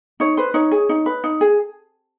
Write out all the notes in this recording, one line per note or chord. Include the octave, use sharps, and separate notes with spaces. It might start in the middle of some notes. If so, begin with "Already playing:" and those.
D#4 C#5
B4 C5
D#4 C#5
G#4
D#4
B4
D#4
G#4